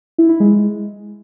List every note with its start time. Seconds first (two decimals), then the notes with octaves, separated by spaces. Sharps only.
0.18 E4
0.29 E4
0.40 G#3